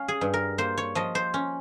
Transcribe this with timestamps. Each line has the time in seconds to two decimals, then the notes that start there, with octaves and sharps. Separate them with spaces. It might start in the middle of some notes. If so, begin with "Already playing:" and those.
Already playing: C#4 F5
0.08 G#4
0.21 G2
0.34 A#4
0.58 A#3 C5
0.78 C#5
0.95 F3 D#5
1.15 C5
1.34 C#4